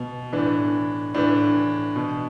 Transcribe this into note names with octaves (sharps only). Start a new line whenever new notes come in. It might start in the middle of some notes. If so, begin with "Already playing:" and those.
Already playing: B2
A2 E3 D4
A2 E3 D4
B2